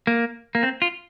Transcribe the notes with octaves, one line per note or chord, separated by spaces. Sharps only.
A#3
A#3
C4
F4